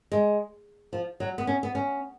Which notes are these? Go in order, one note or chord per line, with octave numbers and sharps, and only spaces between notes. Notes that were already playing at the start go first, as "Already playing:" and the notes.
G#3
F3
F#3
B3
C#4
B3
C#4